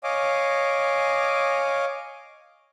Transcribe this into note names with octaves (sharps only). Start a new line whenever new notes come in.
C#5 D#5 F5 G#5 D6